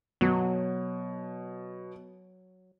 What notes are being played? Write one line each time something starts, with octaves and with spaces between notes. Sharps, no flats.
B2 F#3